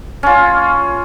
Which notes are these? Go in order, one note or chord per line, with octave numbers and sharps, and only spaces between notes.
C#4 F4